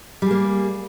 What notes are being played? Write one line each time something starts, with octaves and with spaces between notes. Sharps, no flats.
G3 A#3 G#4